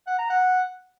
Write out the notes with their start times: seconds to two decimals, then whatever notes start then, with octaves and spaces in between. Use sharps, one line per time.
0.07 F#5
0.18 A#5
0.30 F#5